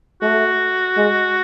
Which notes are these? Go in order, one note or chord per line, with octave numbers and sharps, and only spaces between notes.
A3 F#4
G#3